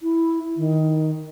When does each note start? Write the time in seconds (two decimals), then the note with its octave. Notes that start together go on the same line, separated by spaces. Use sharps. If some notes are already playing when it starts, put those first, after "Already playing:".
0.03 E4
0.57 D#3